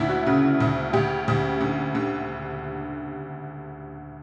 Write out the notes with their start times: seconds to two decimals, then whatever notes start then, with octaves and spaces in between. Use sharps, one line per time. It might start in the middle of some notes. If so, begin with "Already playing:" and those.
Already playing: D2 D4 E4
0.09 F#4
0.26 C#3 F#4
0.60 D2
0.93 D2 G4
1.28 D2
1.61 D3
1.95 D3